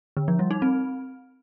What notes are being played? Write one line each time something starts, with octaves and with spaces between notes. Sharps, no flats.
D3
F3
G3
D#4
C4